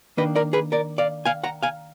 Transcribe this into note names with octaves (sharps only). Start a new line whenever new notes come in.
D#3 A#3 D4 B4 D#5
A#4 D5
G#4 B4
A#4 D5
D5 F5
F5 G#5
F#5 A#5
F5 G#5